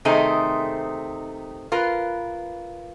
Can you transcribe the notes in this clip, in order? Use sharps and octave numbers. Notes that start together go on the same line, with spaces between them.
C3 D#3 A3 C4 D#4 G#4
F4 A#4 B4